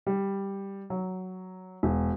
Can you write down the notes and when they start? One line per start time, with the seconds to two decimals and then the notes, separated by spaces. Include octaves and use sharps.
0.07 G3
0.90 F#3
1.83 E1